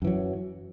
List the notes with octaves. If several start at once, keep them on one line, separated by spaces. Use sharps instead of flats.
F#2 E3 F#3